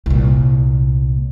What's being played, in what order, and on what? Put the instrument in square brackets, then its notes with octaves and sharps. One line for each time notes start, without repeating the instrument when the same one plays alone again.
[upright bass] C2 A#2